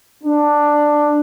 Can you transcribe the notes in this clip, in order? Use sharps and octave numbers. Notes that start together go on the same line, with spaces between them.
D4